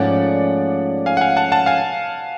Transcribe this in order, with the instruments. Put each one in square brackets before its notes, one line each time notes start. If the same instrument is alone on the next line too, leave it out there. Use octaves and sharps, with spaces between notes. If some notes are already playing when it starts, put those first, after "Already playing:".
Already playing: [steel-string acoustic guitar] G#2 F3 A3 C#4 [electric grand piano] D5 F#5
[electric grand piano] F5 G#5
F#5
F5 G#5
F#5 A5
F#5 A5
F5 G#5